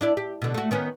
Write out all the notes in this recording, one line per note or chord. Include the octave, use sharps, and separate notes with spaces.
D4 E4 D5
G4
B2 D3
A3 F#4
D#3 B3 C#4